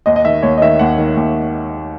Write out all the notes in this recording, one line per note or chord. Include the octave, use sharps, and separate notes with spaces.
D#2 D#5
D#5
D#3 E5
D#2 C#5
D#5
D#3 E5
D#2 F#5
D#3
D#2